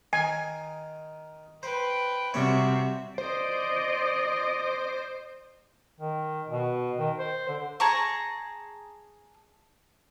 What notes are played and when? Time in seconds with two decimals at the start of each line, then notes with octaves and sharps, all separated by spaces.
0.13 D#3 G#5
1.63 B4 C5 G5
2.34 C3 G3 F#4 C#5 E5
3.18 C5 D5 D#5
6.00 D#3
6.49 B2
6.98 D#3
7.19 C5
7.48 D3
7.80 G#4 A5 A#5 C#6